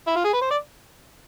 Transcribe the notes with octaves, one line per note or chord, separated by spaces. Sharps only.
E4
F4
G#4
B4
C5
D5